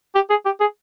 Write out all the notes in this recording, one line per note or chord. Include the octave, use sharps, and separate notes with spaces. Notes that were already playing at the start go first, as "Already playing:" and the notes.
G4
G#4
G4
G#4